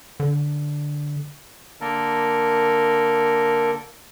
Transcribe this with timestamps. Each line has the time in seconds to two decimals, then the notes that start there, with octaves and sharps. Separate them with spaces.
0.20 D3
1.81 D3 A#3 A4 A#4